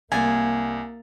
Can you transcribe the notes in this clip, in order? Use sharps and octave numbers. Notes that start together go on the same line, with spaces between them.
C2 A#3 G#5 A6